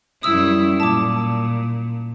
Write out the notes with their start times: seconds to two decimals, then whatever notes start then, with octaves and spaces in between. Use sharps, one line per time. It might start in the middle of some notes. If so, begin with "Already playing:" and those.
0.23 F#2 G3 E4 D#6 E6
0.80 A#2 A5 D6